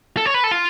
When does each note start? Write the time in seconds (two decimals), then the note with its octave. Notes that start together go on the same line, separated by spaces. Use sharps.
0.17 A4
0.26 C#5
0.34 B4
0.44 A4
0.51 F4